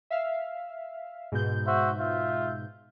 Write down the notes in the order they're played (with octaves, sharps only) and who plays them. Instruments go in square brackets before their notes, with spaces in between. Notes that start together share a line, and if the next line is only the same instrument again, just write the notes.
[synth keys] E5 F5
G#2 B2 G6
[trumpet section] F#4 C5 E5
F4 E5